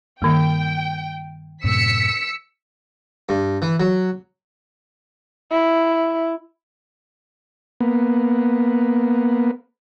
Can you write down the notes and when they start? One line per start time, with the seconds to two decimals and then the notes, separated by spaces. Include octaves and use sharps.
0.22 G2 D#3 A#3 G5
1.64 F#2 A2 C3 E6 B6 C#7
3.29 G2
3.62 E3
3.80 F#3
5.51 E4
7.80 A#3 B3